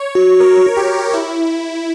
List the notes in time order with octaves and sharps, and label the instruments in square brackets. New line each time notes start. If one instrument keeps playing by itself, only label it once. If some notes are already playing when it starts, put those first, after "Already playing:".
Already playing: [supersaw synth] C#5
[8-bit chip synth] F#4
[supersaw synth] A#4
G4
E4